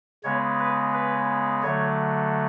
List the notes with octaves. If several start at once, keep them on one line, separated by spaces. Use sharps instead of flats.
C#3 G#3 B3 C#5
B4
B4
D3 F#3 A3 C#5